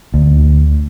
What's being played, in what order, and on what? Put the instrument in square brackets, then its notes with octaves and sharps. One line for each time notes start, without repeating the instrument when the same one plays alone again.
[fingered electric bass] D2